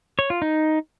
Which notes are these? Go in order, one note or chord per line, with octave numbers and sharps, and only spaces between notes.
C#5
F4
D#4